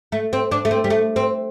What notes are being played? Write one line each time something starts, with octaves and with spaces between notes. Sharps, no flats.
A3
C4
D4
A3
C4
G3
A3
C4